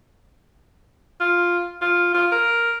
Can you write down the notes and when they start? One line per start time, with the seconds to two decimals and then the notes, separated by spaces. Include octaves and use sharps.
1.20 F4
1.81 F4
2.14 F4
2.32 A#4